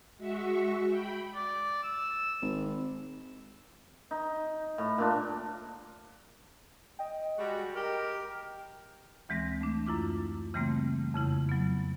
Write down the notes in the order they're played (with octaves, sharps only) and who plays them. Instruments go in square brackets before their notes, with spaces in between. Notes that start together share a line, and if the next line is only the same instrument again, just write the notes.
[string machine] G#3 F#4 E5 C#6
G5 B5
[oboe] D5
E6
[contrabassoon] G#1
[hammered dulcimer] D#4
A2
A#2 D4
[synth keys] D#5 G5
[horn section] G3 G#3 F#4
G4 A#4
[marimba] D2 E3 G#3 C4 A#6
A3 D4
F#2 E4 F4 D6
C#3 E3 G3 A3 A#3 C4
F2 C#3 E4
F#3 B3